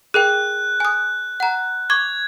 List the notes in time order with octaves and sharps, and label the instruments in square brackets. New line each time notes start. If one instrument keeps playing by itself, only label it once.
[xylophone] G#4 A#4 G5 [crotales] F#6
[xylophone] G#5 D#6
F#5 A#5
[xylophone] C#6 D6 [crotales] G#6